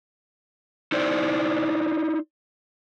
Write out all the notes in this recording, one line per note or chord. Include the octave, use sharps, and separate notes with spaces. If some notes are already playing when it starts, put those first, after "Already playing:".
D#4 E4 C5 D5